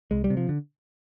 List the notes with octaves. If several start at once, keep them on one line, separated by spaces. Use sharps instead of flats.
C2 G#3
G3
C3
F3
D3